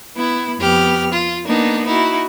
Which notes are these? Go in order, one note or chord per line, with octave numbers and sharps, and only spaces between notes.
B3 E4
F2 B3 G4 F6
F4
A#3 B3 D4 D#4
D#4 E4 F#4